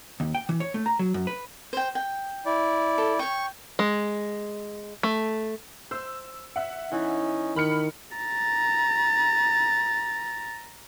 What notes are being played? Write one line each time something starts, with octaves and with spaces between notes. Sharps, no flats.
D#2
G5
E3
C#5
A3
A#5
F#3
F#2
B4
C5 G5
G5
E4 D5
A4
C#5 G5 C#6
G#3
A3
C5 E6
E5 F#5
E3 C#4 D#4
D#3 B5 F6 C#7
A#5 A6